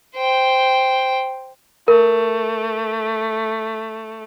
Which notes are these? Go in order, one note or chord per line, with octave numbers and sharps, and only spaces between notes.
C5 G5
A3 A#4